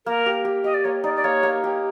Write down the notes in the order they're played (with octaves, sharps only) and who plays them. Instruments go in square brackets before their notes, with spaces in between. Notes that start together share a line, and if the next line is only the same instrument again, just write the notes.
[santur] A#3 [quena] A#4
[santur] G4
G4
[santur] G4 [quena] D#5
[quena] D5
[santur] A#3 [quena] C#5
[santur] D#4 [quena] D5
[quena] D5
[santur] A#3 [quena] C#5
[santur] A#3
G4